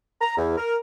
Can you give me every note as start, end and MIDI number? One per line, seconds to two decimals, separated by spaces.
0.21 0.36 82
0.37 0.56 40
0.57 0.76 70